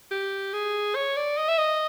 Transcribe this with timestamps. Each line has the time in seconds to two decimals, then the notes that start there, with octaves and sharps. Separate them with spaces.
0.11 G4
0.53 G#4
0.96 C#5
1.17 D5
1.37 D#5
1.48 E5
1.58 D#5